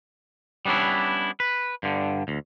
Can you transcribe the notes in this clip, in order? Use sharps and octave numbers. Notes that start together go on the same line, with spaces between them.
G3 B3 C#4 D4 E4
B4
G2 D3
D2